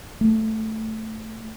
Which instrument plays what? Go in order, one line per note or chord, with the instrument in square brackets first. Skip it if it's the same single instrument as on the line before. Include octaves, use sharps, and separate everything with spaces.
[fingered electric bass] A3